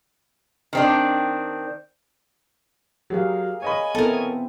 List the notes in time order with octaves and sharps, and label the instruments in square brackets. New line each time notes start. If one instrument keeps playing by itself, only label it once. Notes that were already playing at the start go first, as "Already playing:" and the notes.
[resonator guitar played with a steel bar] D#3 C4 D4
[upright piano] F#3 G3 [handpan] G#4 A#4 F5
[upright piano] C#5 D#5 B5 [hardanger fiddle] G#5
[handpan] B3 C4 E4 [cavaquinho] A4 A#4